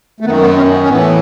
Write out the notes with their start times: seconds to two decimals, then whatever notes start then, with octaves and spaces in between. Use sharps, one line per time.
0.21 A3
0.25 D#3 B3
0.28 F#2
0.41 B3
0.57 C#4
0.73 B3
0.83 C#4
0.89 A2 E3 B3